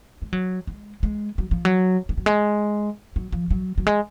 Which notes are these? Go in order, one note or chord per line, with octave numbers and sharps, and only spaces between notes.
G#3
F#3
G#3
G#3
F#3
F3
F#3
G#3
F#3
G#3
F#3
F3
F#3
F#3
G#3